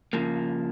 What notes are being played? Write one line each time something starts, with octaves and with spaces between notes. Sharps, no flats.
C#3 F3 A#3